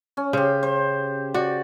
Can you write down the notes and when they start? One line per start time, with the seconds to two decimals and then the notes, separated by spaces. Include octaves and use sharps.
0.17 C#4
0.33 C#3 G4 C5
0.63 C5
1.34 F#4 D5